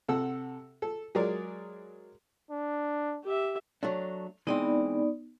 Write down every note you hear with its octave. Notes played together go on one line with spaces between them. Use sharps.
C3 A4 F#5 E6
A4
F#3 G#3 G#4 A#4 D5
D4
G4 E5
F#3 A3 D4
E3 G#3 B3 C4 D#4 D5